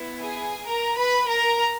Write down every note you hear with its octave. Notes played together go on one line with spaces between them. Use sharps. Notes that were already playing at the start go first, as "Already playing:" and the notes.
Already playing: B3 E4
G#4 G#5
A#4 A#5
B4 B5
A#4 A#5